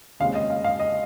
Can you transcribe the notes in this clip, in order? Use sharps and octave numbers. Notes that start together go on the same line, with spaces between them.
D#2 C#3 G#3 C4 F5
D#5
F5
F5
D#5